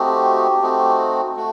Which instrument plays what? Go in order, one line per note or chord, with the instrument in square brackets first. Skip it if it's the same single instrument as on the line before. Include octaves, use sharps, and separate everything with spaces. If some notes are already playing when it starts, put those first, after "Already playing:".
Already playing: [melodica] A3 C4 D#4 F#4 G4
A3 C4 D#4 F#4
A3 F#4